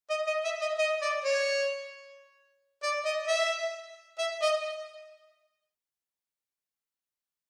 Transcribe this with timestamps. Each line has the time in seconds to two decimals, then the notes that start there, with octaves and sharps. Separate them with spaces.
0.10 D#5
0.27 D#5
0.45 E5
0.61 D#5
0.79 D#5
1.02 D5
1.24 C#5
2.83 D5
3.05 D#5
3.28 E5
4.18 E5
4.42 D#5